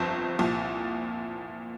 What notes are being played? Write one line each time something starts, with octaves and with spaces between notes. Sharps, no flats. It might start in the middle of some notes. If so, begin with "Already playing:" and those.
Already playing: G1 F2 F3 C4
C2 A#2 F3